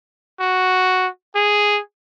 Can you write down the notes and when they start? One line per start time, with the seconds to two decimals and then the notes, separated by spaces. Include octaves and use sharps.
0.40 F#4
1.35 G#4